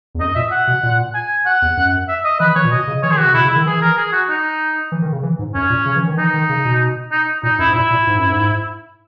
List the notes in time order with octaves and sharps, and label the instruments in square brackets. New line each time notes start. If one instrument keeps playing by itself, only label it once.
[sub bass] E2
[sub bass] F#2 [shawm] D#5
[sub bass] A#2 [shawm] E5
[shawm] F#5
[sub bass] B2
A#2
[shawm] G#5
F#5
[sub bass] E2
F#2
[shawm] E5
D#5
[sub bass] E3 [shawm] B4
[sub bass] E3 [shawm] C#5
[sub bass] A#2
[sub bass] B2 [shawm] D#5
[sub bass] C#3
[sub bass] E3 [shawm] C#5
[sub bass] D#3 [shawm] G#4
[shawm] F#4
[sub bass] C#3
[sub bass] B2 [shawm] E4
[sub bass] C#3
[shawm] E4
[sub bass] D#3
[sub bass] E3 [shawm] G#4
[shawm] A#4
G#4
F#4
D#4
[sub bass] E3
D#3
C#3
E3
G#2
[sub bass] F#2 [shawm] C#4
[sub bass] A#2
C#3
E3
D#3
[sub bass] E3 [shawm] D#4
[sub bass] D#3
C#3
B2
[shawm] D#4
[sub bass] A#2 [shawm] D#4
[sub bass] F#2 [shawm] E4
[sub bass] G#2
[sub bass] A#2 [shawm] E4
[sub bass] A#2
G#2
F#2
G#2